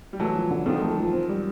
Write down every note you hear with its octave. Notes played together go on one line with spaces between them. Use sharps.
G3
E3 F#3 A3
F3
D3
F2 D#3 F3
A3
F3
C4
G3